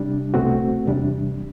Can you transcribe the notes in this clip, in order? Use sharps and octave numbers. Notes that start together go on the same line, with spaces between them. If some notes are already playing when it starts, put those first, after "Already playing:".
Already playing: C3 G3 D4
C2 B2 A3 C4 F#4
E2 C3 G3 D4